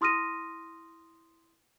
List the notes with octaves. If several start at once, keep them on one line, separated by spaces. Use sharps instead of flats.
E4 C6 D#6 F6 A#6 D#7